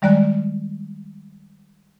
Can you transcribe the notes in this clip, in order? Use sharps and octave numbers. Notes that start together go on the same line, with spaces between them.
D#3 G3 G#3 D5 A#5 F#6